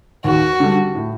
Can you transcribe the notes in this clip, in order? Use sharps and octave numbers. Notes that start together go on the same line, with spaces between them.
D#2 F#4
D3 G3
A2